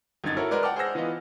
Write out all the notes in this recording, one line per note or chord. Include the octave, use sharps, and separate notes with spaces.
G1 F#2 D#4 G#6 A6
E4 F#4 A4 A#4 C#5
G#3 A#4 B4 D5
F#5 G5 A5 D6 F6
G#4 C5 F#5 E6 A#6
E3 B3 F4 D#5